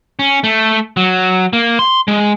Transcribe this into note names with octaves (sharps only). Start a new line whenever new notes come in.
C#4
A3
F#3
A#3
C6
G#3